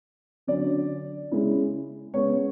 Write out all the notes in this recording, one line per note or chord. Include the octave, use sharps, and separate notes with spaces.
D3 F#3 C#4 D5
C#3 G#3 C#4 E4
C#3 G#3 B3 C#5